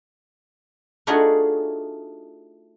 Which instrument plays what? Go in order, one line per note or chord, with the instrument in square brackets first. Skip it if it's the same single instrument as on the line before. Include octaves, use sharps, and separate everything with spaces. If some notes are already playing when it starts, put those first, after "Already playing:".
[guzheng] A3 D4 D#4 F4 F#4 G#4